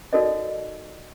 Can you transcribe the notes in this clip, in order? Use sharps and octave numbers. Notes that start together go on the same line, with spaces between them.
D#4 F#4 A4 A#4 D5 D#5